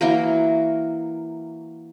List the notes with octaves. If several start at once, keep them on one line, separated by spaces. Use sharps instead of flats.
E3 F#3 A#3 A#4